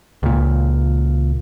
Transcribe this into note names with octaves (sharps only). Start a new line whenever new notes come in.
C#2 A#2